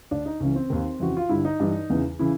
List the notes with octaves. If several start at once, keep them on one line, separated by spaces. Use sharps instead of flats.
D2 D3 D4
D#4
C#2 C#3 E3 C#4
C4
D#2 D#3
F2 C#3 E3 F#4
F4
G2 D3 E4
D#4
G2 E3
E2 C#3 E3
C#3 E3 E4